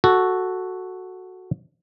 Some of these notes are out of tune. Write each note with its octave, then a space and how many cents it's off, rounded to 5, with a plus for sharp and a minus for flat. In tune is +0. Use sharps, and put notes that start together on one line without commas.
F#4 +0 A4 +0